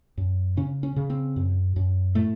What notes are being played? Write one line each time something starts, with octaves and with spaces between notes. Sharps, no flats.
F#2
C#3 C#4
C#4
C#3
C4
F#2
F#2
A2 A3